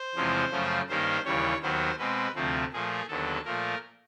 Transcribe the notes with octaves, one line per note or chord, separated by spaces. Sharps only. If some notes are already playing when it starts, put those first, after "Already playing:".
Already playing: C5
E2 C3 F3 G#3 C#4
F#2 C#3 F3 A3 C#4
G2 D#3 G3 A#3 C#4 C5
D#2 C#3 E3 G3 C#5
D#2 D#3 F#3 B3 C5
B2 G#3 C4 B4
D2 C3 F3 A3 C4
A#2 F3 A3 G#4
D#2 D3 F#3 B3 A4
A#2 F3 A3 A#4